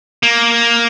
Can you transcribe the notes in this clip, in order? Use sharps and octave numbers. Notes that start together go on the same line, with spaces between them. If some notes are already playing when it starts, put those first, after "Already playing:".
A#3